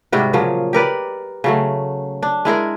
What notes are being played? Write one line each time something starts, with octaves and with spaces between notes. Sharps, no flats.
G#2 C3 G3 F#4
A#2 C#3 F3 F#3
G4 A#4 B4 D5
C#3 F#3 A3
D4
G#3 E4 G#4 A#4